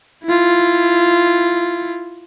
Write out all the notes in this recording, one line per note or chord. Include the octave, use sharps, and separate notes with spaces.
E4 F4